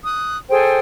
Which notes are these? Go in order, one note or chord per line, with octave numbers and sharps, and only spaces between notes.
D#6 F#6
G#4 A4 C5 G5